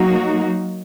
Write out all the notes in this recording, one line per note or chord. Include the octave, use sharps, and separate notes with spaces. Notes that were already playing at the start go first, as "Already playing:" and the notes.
Already playing: F#3 A#3 D#4 F#4